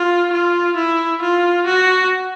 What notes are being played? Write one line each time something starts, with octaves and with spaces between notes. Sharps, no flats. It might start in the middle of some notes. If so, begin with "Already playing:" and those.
Already playing: F4
F4
E4
F4
F#4